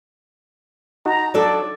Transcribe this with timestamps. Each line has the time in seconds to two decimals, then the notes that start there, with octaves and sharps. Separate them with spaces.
1.06 D#4 F#4 A#5
1.34 F#3 D4 A4 D5